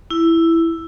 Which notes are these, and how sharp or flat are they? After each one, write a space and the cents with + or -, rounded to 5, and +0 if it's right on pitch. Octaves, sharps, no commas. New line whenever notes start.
E4 +5